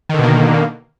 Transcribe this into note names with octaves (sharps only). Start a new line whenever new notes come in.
B2 D3 D#3 A#3